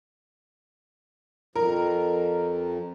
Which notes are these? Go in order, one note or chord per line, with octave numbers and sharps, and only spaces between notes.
F2 A#4